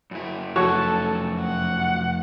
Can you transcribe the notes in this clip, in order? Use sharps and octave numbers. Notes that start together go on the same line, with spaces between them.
F#2 E4
F2 A3 F#4 A4 C#5 C#6
F#5